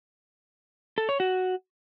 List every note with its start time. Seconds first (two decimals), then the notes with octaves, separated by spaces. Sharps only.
0.98 A4
1.09 C#5
1.20 F#4